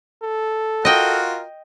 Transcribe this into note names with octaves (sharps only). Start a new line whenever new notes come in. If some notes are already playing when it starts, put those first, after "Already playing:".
A4
F4 F#4 A#4 D#5 G5